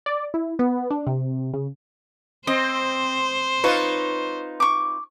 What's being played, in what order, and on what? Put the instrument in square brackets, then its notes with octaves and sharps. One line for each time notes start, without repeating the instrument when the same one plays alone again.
[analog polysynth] D5
E4
B3
D4
C3
C#3
[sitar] C4 [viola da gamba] C5 [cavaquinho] D#5
[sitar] D#4 F4 B4 [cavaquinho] C#5 C#6
[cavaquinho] C#6 D6